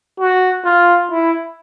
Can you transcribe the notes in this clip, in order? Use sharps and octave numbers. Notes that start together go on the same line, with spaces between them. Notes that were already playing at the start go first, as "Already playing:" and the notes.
F#4
F4
E4